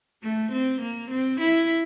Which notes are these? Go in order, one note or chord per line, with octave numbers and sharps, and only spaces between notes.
A3
C4
A#3
C4
E4